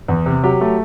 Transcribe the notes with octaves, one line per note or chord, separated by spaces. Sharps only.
E2
C3
F#3 G4
A3